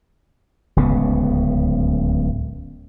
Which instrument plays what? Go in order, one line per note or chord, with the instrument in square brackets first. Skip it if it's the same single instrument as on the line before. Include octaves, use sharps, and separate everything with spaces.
[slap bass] D1 C#2 C#3 B3